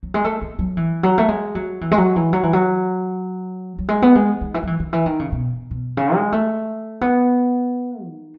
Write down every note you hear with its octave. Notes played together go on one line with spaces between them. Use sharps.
F#3
G#3
A3
A3
F#3
E3
F#3
A3
G#3
F#3
E3
G#3
F#3
E3
F#3
E3
F#3
F#3
G#3
B3
G#3
D#3
E3
F#3
E3
D#3
E3
D#3
C#3
B2
B2
C#3
G#3
A3
B3
D#3